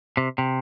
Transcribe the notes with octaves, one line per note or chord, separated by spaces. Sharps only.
C3
C3